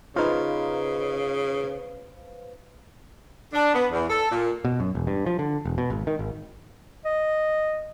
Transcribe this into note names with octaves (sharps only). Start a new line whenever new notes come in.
C#3 D#4 F4 B4 C5 F5
D4
B3
E2
A4
A#2
B2
F#2
E1
G2
F3
D3
E1
B2
G#1
D#3
G#1
D#5